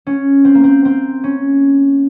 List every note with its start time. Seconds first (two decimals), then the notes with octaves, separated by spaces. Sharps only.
0.07 C#4
0.45 C4
0.55 A#3
0.64 C4
0.85 C4
1.24 C#4